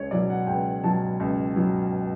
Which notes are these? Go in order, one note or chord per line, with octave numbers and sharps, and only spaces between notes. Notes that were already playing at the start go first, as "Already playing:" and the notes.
Already playing: C#2 C#5
B2 F#3 D5
F#5
C#2 G5
B2 F#3 A5
C#2
B2 F#3